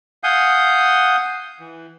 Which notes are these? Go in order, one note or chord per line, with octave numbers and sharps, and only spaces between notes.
F5 F#5 G#5 D#6 G6
E3